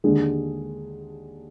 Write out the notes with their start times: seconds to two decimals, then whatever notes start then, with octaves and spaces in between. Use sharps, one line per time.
0.04 D#2 D3 G#3 D4 G#4